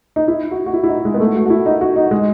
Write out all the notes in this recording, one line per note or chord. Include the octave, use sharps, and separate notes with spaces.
D#4
E4
F#4
F#4
E4
E4
D#4
G#3
B3
A3
F#4
F#4
E4
D#4
F#4
D#4
G#3